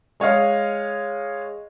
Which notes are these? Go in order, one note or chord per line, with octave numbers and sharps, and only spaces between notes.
G#3 C#5 D#5 F5